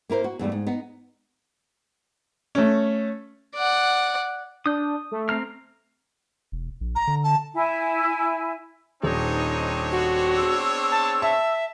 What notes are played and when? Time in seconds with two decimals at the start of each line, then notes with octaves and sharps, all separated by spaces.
0.09 A#3 E4 A#4 C5
0.24 F#4
0.39 E2 G2 G3 A3
0.52 G#2
0.67 B3 D#4
2.55 A3 C#4
3.55 D5 F#5
4.66 D4 D#6 G6
5.11 A3
5.29 C4 A#5 F6
6.52 E1
6.81 A#1
6.95 A#5
7.07 D3
7.23 A5
7.54 E4 G#5
9.03 D#1 C4 D4 D#4 C#5
9.91 F#4
10.37 B3 G#4 E6
10.91 A5
11.22 E5 A5